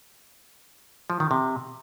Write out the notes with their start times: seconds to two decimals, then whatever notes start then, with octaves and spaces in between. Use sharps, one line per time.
1.10 F3
1.20 D#3
1.31 C3